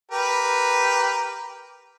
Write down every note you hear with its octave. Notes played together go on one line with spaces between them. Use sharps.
G4 A#4 B4